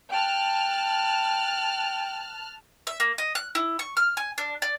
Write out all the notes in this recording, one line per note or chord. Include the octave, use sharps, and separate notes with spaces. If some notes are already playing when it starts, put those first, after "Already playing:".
G5 A5 F6 F#6
E5
A#3
D#5
F#6
E4
C#6
F6
G#5
D4
D5